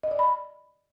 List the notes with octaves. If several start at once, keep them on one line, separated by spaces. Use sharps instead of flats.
D#5
D5
B5